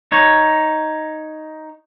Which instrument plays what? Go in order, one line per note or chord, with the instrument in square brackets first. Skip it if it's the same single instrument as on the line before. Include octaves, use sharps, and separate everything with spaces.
[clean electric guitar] D#4 C#5